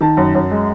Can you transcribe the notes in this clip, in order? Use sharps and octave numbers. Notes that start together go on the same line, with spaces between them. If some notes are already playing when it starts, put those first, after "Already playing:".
D#3 A5
F#2
F#2
G#3